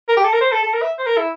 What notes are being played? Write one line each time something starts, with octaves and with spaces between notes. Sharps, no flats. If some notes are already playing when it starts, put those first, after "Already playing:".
A#4
G4
A4
A#4
C5
A4
A4
A#4
E5
C5
A#4
E4